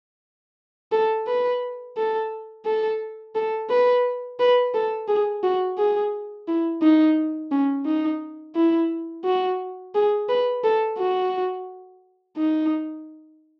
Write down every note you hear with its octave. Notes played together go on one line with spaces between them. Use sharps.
A4
B4
A4
A4
A4
B4
B4
A4
G#4
F#4
G#4
E4
D#4
C#4
D#4
E4
F#4
G#4
B4
A4
F#4
D#4